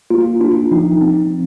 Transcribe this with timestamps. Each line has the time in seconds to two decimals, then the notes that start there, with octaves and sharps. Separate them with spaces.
0.10 A#3 F4
0.41 D4 F4
0.71 F3 D#4
1.01 C4